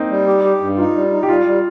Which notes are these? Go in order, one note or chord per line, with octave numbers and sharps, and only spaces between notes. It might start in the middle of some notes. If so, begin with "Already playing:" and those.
Already playing: A#3 C4 D#4
G3
G4
G4
G2
D#4 F4
G3
D#4
G4
G3 F4
G3